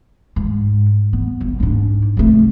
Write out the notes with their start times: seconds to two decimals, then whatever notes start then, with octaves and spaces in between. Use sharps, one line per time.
0.36 G#2
1.13 B3
1.41 G1
1.60 G#2 D4
2.17 C2 A3